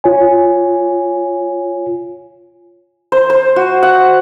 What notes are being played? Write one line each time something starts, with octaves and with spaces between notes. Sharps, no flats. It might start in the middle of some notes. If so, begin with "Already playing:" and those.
F4 C#5 G#5
C5
C5
F#4
F#5